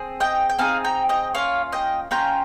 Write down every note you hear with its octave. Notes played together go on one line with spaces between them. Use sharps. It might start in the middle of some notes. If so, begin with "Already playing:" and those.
Already playing: C4 G#4
D#5 G5
G5
C4 D#4 G#4 F5 G#5
G5 A#5
D#5 G5
A#3 C#4 F4 C#5 F5
D#5 G5
A#3 C#4 F4 G5 A#5